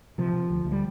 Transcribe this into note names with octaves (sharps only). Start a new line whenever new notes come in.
C3 F3
C3
D2
D2
G3